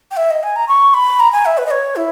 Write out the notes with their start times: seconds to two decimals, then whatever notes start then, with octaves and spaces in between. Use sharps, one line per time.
0.11 G5
0.17 E5
0.31 D#5
0.43 G#5
0.56 A#5
0.68 C#6
0.94 B5
1.20 A#5
1.32 G#5
1.46 E5
1.58 B4
1.66 D#5
1.71 C#5
1.96 E4